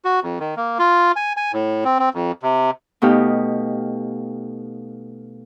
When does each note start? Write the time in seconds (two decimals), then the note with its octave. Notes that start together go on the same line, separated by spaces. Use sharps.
0.05 F#4
0.23 F2
0.40 D#3
0.56 A#3
0.79 F4
1.16 G#5
1.37 G#5
1.53 A2
1.85 C4
1.99 C4
2.14 F2
2.43 C3
3.02 B2 A3 D#4 G4 F5